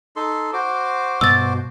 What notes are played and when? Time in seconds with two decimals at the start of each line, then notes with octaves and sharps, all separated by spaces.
0.16 D#4 A4 C6
0.53 F#4 C5 D6
1.21 G2 B2 E6 A6